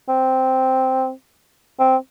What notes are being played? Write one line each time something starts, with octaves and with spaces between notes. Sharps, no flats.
C4
C4